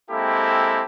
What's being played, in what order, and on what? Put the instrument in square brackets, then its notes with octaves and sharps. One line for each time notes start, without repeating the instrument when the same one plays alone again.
[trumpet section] G#3 A#3 C4 E4 G4 A4